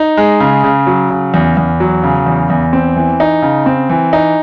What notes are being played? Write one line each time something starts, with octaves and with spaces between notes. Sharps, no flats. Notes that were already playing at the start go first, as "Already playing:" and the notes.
Already playing: D#4
G#3
C#3
C#3
F#3
C#3
E2
E2
F#3
C#3
E2
E2
C4
E3
D#4
C#3
C4
E3
D#4